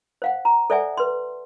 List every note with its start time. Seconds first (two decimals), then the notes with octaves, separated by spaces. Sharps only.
0.22 C5 F5 F#5
0.45 A#5
0.70 A4 C5 D5 E5 F#5 G#5
0.97 B4 C6